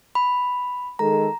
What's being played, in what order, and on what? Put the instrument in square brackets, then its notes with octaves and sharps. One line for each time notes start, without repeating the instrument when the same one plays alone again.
[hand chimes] B5
[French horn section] D#3 G#3 A4 [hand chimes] A#5